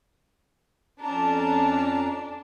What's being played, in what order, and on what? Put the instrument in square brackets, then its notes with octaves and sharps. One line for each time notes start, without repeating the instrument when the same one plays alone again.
[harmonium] F2 C#4 A#5 [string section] D4